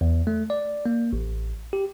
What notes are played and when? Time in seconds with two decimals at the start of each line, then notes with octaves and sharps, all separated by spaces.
0.01 E2
0.27 A3
0.50 D5
0.86 A#3
1.13 A1
1.73 G4